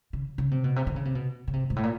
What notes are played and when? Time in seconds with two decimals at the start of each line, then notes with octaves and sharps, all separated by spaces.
0.13 C#3
0.38 C#3
0.51 C3
0.64 B2
0.76 C3
0.87 D3
0.96 C#3
1.05 C3
1.15 B2
1.48 C#3
1.53 C3
1.70 G#2
1.76 A2
1.83 A#2